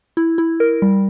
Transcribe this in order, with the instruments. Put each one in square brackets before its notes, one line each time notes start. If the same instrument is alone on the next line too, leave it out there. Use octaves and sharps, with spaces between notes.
[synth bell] E4
E4
A#4
G3